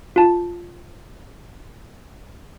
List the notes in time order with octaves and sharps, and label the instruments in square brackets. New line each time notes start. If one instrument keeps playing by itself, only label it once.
[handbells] F4 A5